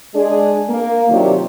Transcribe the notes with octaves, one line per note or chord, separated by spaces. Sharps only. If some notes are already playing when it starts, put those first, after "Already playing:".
G#3 D4 G#4
A#3
C3 D#3 F#3 D4 F4 G4